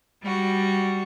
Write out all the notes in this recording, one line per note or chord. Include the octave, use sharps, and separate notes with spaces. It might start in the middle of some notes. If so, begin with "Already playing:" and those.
G3 F#4